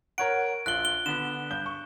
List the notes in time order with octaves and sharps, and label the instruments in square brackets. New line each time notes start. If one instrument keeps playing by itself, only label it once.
[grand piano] A#4 C#5 F#5 [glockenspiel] D7
[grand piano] A#1 F4 F#7 [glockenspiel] F#6 G7
[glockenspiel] G7
[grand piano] D3 B3 [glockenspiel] E7
[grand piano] G2 G6 G7
C#6